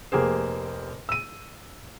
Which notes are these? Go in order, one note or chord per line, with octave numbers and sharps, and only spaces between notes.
F1 A#3 G4 G#4 C5
E6 D#7